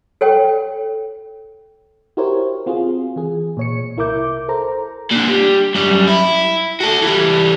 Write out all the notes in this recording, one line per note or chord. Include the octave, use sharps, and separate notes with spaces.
A4 C#5 G5
E4 F#4 G4 A#4 C5 C#5
C4 F4 F#4 G#4
E3 G#4
A#2 C#5 C#7
C2 E4 A#4 E5 D6 G6
A4 A#4 C5 A#5
A#2 D3
G3
F#2 G3
E4
F#4 A4
E3 G3